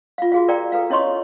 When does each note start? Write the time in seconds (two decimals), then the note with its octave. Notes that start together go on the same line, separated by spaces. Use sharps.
0.18 F4 F5
0.32 F#4 G#4 F5
0.48 A#4 D5 G5 A#5
0.72 A4 B4 F5
0.90 C#4 E4 C#5 D#5 C6 C#6